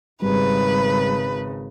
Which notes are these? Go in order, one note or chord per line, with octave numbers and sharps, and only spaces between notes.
G#1 C#3 G3 B4